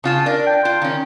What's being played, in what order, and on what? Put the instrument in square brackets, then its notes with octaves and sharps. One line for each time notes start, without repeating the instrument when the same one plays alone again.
[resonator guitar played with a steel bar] C#3 F4 A5
[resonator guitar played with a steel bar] D4 [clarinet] A#4
[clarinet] G5
[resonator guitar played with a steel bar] F4
D#3 C#4